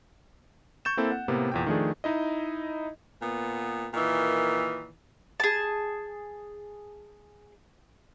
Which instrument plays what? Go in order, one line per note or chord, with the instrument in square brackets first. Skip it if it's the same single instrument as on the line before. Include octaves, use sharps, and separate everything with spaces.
[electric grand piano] C#6 G6 A6 E7
A#3 C4 E4 A4
F#5
A2 C3 A#3 B3
E2 A#2 G5
D#3 F3 A3 D4 G#4
D#4 E4 D#5
[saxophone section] A#2 B3
A#2 D#3 E3
[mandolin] G#4 A5